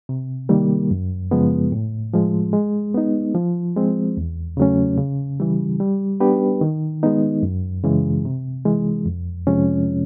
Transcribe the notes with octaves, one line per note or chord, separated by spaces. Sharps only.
C3
D#3 G3 A#3
F#2
C#3 F3 G#3 B3
A2
F3 G#3
G#3
B3 D#4
F3
G#3 C4
E2
C#3 F#3 A3 C#4
C#3
E3 G3
G3
B3 D4 G4 B4
D#3
G#3 B3 D#4
F#2
C#3 E3 G#3
C3
E3 G#3
F2
C3 F3 G#3 C#4